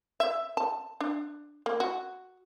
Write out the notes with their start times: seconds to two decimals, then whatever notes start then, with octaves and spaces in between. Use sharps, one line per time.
0.20 E5
0.57 A5
1.01 D4
1.66 A#3
1.80 F#4